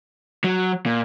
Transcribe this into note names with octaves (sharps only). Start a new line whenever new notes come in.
F#3
A#2